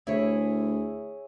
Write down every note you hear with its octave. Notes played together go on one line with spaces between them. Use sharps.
D2 E4 G#4 C#5